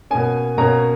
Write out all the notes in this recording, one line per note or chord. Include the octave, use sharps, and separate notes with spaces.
B2 A#3 C#4 G#5
B2 A#3 C#4 A#5